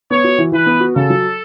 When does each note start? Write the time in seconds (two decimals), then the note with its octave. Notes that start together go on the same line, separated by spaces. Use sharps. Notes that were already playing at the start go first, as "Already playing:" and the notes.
0.10 B3 C#5
0.24 F#4
0.38 E3
0.52 E3 B4
0.66 B3
0.80 F#4
0.96 C#3 A4
1.10 F#3